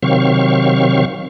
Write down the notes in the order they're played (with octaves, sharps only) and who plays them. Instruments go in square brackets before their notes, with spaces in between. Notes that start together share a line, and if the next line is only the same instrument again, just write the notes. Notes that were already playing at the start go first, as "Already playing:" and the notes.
[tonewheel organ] C3 D#3 F#3 C4 F5 C#6